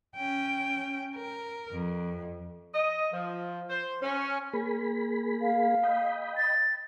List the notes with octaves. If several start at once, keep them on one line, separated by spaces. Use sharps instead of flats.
C#4 G5
A#4
F2
D#5
F3
C5
C#4
A#3 G#4 B5
F5
D#5 G5 B5
A6